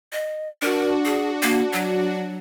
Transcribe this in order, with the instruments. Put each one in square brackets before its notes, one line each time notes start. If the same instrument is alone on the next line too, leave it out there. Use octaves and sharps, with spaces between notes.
[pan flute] D#5
[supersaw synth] D4 F#4 [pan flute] A#4
[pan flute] G#4
A#3
F#3